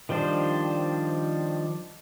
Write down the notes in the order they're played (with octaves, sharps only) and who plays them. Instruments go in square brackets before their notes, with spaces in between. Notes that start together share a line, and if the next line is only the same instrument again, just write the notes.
[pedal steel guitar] D#3 F3 G3 D4 C5